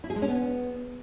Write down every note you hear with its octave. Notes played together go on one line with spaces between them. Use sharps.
E4
G#4
G#3
C#4
B3